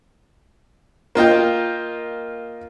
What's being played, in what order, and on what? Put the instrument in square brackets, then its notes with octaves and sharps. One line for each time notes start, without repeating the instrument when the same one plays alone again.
[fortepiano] A#3 F4 D#5 G5